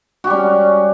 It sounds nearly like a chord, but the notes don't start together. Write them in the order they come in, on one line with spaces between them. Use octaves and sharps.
F#4 G4 G3 C#4